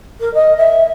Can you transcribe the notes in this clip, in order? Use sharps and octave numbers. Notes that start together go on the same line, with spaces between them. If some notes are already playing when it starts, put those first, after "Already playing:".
A#4
D#5
E5